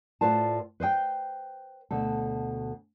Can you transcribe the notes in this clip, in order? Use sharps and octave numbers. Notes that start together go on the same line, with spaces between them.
A2 F4 B4 C5 D5 A5
B4 C5 D#5 G5
D2 B2 A4